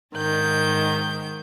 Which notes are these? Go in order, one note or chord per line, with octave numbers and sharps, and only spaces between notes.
G#2 D#3 G6